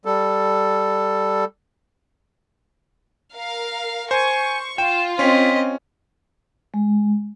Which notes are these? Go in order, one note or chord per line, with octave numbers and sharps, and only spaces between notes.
G3 A4
A#4 F5
C5 G#5 C#6
F4 G5 E7
C4 C#4 D#5 B6
G#3